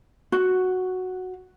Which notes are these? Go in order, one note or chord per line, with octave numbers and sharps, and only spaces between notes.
F#4